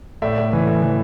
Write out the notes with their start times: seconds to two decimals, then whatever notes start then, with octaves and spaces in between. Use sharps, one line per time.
0.22 A2 D5 E5
0.38 A2
0.53 E3
0.68 E3
0.82 E3